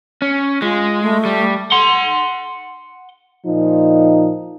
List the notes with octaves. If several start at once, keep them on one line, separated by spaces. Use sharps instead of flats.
C#4
G#3 F4
A3
G3
F#5 C6
A#2 F3 D#4